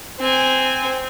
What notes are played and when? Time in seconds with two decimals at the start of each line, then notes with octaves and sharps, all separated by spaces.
0.20 C4 G#5